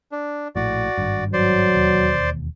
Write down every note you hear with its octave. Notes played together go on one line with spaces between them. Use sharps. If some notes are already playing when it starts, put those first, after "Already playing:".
D4
A#1 A2 F#4 D5
G#1 G2
F#3 C5 D5
E1 D#2